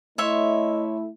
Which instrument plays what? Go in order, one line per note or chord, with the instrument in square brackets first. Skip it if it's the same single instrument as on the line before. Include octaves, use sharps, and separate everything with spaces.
[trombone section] A3 E4 [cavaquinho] C#5 E5 C6 [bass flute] D#5